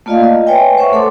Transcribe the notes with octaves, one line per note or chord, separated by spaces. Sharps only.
A3 A#3 F4 D5 D#5 F5
D#5
B4 C#5 E5 G5 G#5
C5 C#5 E5 F#5 C#6
A3 A4 F#5 C6 D6